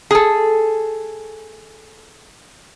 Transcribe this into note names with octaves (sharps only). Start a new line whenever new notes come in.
G#4 A4